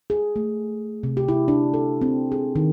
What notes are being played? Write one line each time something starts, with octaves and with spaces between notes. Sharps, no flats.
G#4
A3
C3
G4
E4
D4
A4
C4
G#4
D#3